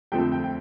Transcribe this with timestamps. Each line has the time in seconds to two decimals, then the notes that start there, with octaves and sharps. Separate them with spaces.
0.12 F2 D3 F3 A3 C4 G5
0.32 G5
0.44 G5